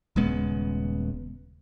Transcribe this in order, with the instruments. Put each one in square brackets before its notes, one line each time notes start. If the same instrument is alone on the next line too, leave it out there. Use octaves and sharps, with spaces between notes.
[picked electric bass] D#1 C#3 G#3 B3